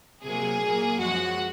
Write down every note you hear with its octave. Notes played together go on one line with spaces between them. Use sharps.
C3 F#3 A#3 G#4 G#5
A#2 F#3 A#3
F#2 F3 G#3 F#4 F#5